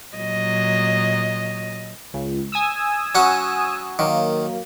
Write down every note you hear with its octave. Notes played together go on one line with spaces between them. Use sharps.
A#2 F#3 D#5
C#2
G#5 D#6 E6
F#3 C#4 F#5
D#3 F#3 A#3